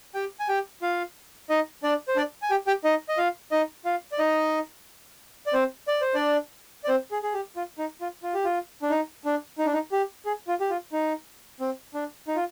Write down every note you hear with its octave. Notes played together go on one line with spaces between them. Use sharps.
G4 G5
G#5
G4 G5
F4 F5
D#4 D#5
D4 D5
C5
D4 D5
G#5
G4 G5
G4 G5
D#4 D#5
D#5
F4 F5
D#4 D#5
F4 F5
D5
D#4 D#5
D5
C4 C5
D5
C5
D4 D5
D5
C4 C5
G#4
G#4
G4
F4
D#4
F4
F4
G4
F4
D4
D#4
D4
D#4
D4
D#4
G4
G#4
F4
G4
F4
D#4
C4
D4
D#4
F4